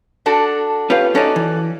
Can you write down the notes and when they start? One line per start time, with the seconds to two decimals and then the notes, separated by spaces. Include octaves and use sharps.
0.26 D4 F#4 A4
0.90 C#4 F4 G4 B4 F5
1.15 C#4 D#4 F#4 A4 D5
1.36 E3